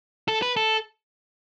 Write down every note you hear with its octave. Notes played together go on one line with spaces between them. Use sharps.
A4
B4
A4